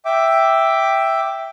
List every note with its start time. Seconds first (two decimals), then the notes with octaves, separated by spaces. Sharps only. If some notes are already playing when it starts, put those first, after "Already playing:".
0.05 E5 G5 D6